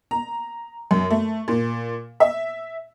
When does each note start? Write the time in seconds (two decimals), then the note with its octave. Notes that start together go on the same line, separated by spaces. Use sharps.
0.11 A#5
0.91 F#2
1.10 A3
1.48 A#2
2.20 E5